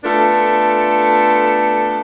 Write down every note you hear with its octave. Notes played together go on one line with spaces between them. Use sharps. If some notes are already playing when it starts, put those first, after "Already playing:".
A3 B3 D4 F4 A4